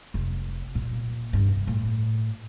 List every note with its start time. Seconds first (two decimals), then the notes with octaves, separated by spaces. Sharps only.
0.14 F1
0.75 A#2
1.33 G2
1.49 F1
1.67 A2